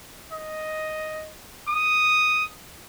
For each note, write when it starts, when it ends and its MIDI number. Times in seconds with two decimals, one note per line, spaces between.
0.33 1.28 75
1.69 2.47 87